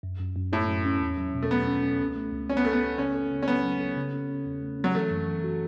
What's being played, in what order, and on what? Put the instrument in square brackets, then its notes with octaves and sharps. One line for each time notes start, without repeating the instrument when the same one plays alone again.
[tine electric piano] F#2
F#2
F#2
[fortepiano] A2 [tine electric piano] E4
[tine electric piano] F#2
C#4
E2
F#3
B2
[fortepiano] A3
[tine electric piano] F#3 [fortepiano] B3
[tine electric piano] C#4
C#4
C#2
A3
C#2
[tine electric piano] C#2 [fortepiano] C#4
[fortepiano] B3
[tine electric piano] C#2 [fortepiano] A3
[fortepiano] B3
[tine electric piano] C#2
[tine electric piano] C#3 [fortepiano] C#4
[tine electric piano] A4
C#3
[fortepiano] C#4
[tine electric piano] F#3 [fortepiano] B3
[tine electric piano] F#3
A4
C#3
C#4
C#4
E2
A3
C#4
[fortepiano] F#3
[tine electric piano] E3 [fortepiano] A3
[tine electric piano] F#2
E3
F#4